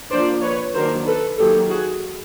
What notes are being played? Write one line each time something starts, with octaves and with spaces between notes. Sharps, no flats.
F3 A#3 D4 C5 D5
B4 C#5
D#3 F#3 A#3 D4 A#4 C5
A4 B4
D#3 F#3 A#3 G4 A4
F#4 G#4